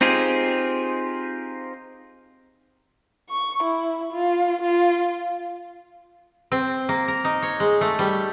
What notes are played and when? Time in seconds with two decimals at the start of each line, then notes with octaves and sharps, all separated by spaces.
0.01 C4 D#4 F4 G4 G#4
3.31 C#6
3.64 E4
4.13 F4
4.62 F4
6.52 C4
6.89 A#3
7.08 A#4
7.24 D#4
7.42 C#5
7.60 G#3
7.81 A3
7.99 G3